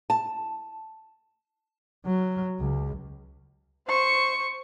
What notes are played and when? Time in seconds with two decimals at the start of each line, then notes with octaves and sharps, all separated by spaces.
0.10 A5
2.06 F#3
2.60 C#2
3.88 C5 C#6